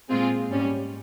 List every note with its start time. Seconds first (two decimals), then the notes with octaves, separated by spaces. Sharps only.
0.10 A#2 G#3 C4 F4 G#4
0.48 G#2 G3 C#4